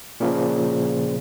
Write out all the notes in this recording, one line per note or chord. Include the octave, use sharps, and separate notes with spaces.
A#2 C#3 F3